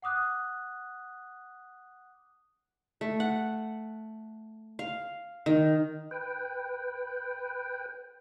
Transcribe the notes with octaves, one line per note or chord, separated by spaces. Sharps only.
F#5 D6 D#6 F#6
A3
F#5
F5
D#3
B4 G5